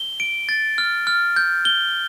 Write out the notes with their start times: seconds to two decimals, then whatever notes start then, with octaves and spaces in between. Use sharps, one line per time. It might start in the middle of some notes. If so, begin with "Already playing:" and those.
Already playing: G7
0.20 D7
0.49 A6
0.78 F6
1.07 F6
1.36 G6
1.65 G7